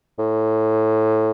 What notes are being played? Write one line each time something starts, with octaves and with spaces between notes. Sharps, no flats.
A2